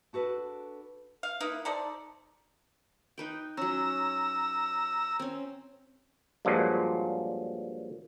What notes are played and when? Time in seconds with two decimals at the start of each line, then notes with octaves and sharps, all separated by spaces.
0.13 D4 F#4 A4 B4
1.23 F5
1.40 A#3 D#4 E4 B4
1.65 D#4 A4 C5 D5
3.18 D#4 B4 G5
3.57 F#3 C#4 A#5 E6
5.19 C4 C#4
6.45 G2 A#2 F3 F#3 G#3